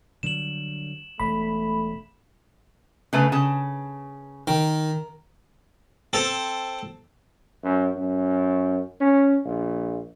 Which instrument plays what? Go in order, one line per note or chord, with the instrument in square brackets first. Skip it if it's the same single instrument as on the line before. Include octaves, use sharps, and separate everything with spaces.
[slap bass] D3 F#3 G3 [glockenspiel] E7 F#7
[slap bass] E1 [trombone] A3 [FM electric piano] B5
[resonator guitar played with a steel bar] C#3 A3 B4
C#3 A5
[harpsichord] D#3 [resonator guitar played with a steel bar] A#4
[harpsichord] C4 A4
[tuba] F#2
F#2
C#4
A#1